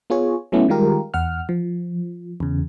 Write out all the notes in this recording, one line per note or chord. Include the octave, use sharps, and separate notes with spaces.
B3 F4 G#4 C#5
F#3 A3 B3 C#4 E4
D#3 G3 G#3 F4 G4 A#4
E2 F#5 F6
F3
E2 C#3